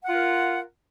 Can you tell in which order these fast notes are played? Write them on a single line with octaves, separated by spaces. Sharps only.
F#5 F4 A#4